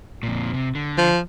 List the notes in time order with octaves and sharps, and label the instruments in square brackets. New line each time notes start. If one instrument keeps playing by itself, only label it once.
[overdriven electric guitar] F2 A#2
C3
D3
[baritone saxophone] F3